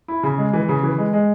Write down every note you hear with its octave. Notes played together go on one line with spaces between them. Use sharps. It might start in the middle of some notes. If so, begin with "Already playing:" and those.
E4
C#3
G#3
E3
C#3
E3
G#3
G#3